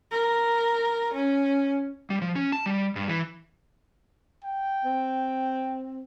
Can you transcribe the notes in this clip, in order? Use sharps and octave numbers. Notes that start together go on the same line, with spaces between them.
A#4
C#4
G3
F3
C#4
A5
G3
G2
E3
G5
C4